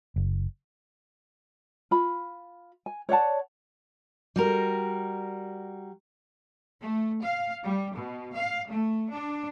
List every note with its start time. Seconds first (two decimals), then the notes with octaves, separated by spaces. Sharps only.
0.16 F#1
1.91 F4 B5
2.86 G#5
3.09 C#5 D5 F#5 A5
4.36 G3 F#4 A#4
6.81 A3
7.22 F5
7.64 G3
7.96 B2
8.35 F5
8.70 A3
9.12 D4